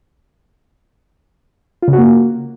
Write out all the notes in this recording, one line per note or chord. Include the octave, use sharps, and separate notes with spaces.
F4
C#3
F#4
A#3